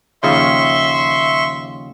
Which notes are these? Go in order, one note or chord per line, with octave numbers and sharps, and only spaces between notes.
D#2 C#3 F3 E5 C6 C#6